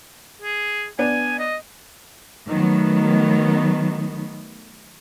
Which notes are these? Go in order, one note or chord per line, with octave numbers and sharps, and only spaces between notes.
G#4
B3 D4 G#5
D#5
D#3 F#3 A3 B3